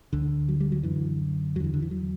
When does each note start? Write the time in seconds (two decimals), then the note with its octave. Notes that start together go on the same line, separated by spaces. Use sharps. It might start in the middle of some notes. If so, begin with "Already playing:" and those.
0.13 D2 D3
0.48 F#3
0.60 G3
0.72 F#3
0.83 F#2 D3 E3
1.55 E2 F#3
1.60 D3 E3
1.74 D3
1.82 E3
1.91 F#3